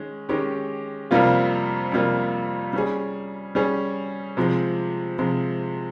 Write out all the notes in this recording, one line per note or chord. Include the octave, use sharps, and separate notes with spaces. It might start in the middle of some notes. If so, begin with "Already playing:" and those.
Already playing: D#3 G#3 C#4
D#3 G#3 C#4 G4
F2 C3 G3 A#3 F4
F2 C3 G3 A#3 F4
G3 C#4 G#4
G3 C#4 G#4
C3 F3 G#3
C3 F3 G#3